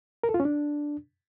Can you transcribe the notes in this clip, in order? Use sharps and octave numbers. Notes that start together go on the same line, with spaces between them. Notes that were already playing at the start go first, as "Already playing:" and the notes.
A#4
A4
F4
C#4
D4